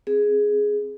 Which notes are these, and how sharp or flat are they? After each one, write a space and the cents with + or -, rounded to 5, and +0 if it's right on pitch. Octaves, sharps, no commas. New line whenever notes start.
C4 +15 G#4 +5